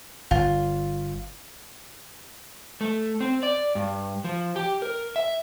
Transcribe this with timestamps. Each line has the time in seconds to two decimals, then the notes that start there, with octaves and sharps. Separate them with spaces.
0.31 G1 F4
2.81 A3
3.21 C4
3.43 D5
3.75 G2
4.24 F3
4.56 G4
4.82 A#4
5.16 E5